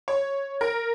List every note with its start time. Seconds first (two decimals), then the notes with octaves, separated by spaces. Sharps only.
0.08 C#5
0.61 A#4